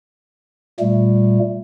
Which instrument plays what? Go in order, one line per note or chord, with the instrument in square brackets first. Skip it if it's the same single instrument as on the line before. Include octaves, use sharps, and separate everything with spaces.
[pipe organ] A#2 G3 A3